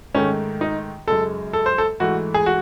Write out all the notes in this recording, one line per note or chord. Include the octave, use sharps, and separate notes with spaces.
G#2 D#3 A3 C#4
D#4
F#2 C#3 G#3 A4
A4
C5
A4
G#2 E3 A3 F#4
G#4
F#4